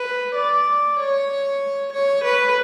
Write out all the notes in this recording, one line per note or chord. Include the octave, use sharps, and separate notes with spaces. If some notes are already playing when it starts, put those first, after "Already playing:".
Already playing: B4
D5
C#5
C#5
B4